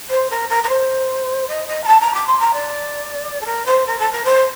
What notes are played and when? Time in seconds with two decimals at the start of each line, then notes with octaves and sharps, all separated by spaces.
0.09 C5
0.30 A#4
0.49 A#4
0.63 A#4
0.69 C5
1.47 D#5
1.68 D#5
1.83 A#5
1.87 A5
2.00 A#5
2.14 D6
2.27 C6
2.40 A#5
2.53 D5
3.41 A4
3.45 A#4
3.66 C5
3.86 A#4
3.99 A4
4.12 A#4
4.25 C5